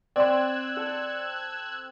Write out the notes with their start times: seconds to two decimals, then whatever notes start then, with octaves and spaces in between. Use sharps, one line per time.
0.16 C4 D5 C6 E6 F#6 G#6
0.77 A4